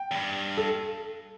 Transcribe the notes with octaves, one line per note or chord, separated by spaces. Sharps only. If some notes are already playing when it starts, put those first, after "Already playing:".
Already playing: G5
E2
G2
A4